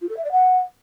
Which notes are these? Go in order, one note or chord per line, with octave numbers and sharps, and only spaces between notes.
F4
A4
E5
D5
F#5